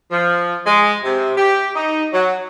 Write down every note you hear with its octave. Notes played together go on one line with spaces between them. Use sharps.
F3
G#3
C3
G4
D#4
F#3